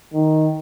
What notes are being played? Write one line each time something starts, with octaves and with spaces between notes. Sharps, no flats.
D#3